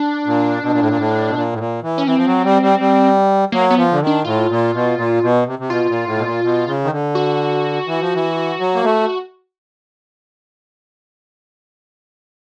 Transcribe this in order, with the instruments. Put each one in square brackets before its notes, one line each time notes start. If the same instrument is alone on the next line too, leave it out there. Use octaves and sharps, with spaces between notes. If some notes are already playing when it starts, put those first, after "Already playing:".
Already playing: [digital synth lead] D4
[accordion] A#2
B2
A#2
A2
A#2
A2
B2
A#2
A2
A#2
E3
[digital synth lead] C#4
[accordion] E3 [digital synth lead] C4
[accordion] F3
F#3
G3
G3
G3
[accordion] F#3 [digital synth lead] A#3
[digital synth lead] B3
[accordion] F3
D3
D#3
[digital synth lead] D4
[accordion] A2 [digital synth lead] F4
[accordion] A#2
B2
A#2
B2
C3
C3
[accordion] B2 [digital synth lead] F4
[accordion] A#2
A2
B2
A#2
B2
C#3
D#3
D3
[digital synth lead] F#4
[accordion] E3
F3
E3
F#3
A#3
A3